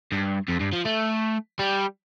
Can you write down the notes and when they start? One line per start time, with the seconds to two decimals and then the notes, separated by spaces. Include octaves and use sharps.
0.12 G2
0.49 F2
0.60 G2
0.73 F3
0.85 A3
1.59 G3